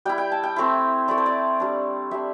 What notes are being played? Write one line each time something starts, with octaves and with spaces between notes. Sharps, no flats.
G3 E4 G5
G5
A5
G5
A3 C4 E4
A3 E4 D5
C5
D5
G3 D4
G3 D4 E5